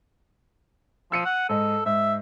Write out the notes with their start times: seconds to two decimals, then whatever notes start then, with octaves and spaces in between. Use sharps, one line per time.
1.12 F3 E6 C#7 D#7
1.25 F#5
1.49 G#2 A4 D#5
1.86 G#2 E5